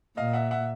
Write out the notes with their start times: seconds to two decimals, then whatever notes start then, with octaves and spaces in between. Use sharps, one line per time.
0.17 A#2 D#5 F5
0.33 E5 F#5
0.51 E5 F#5